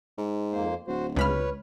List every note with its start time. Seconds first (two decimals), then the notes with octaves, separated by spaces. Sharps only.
0.18 G#2
0.52 F2 A#3 C5
0.88 D1 F#4 C5
1.16 C#2 B4 C#5 B5 F6